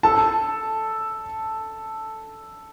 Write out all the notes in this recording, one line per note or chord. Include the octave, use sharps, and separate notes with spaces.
A4 A5